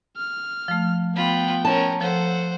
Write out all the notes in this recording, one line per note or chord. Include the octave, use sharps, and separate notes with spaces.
F6
F3 A3
B3 F4 G5 B5
C#4 A#4 A5
F3 A4 C5 F#5